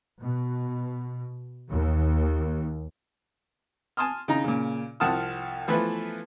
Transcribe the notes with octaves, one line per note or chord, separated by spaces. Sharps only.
B2
D#2
G#5 A5 C6 D#6 F6
C#3 D#4 A#5
A#2 C#3
C2 F3 F#5 A5 D#6 F6
E3 F3 A3 B3 B4